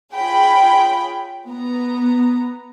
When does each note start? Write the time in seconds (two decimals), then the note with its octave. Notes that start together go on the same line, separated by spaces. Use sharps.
0.14 F4 G#4 C#5 G5 B5
1.48 B3 A#5